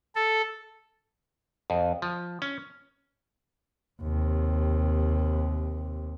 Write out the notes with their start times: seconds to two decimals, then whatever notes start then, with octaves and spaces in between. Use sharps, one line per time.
0.16 A4
1.70 F2
2.02 F3
2.42 C#4
4.02 D#2 C3